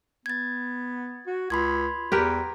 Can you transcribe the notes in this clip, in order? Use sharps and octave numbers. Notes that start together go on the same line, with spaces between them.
B3 G#6 A6
F#4
C#2 B5 C6 G#6
E2 G4 A#4 B4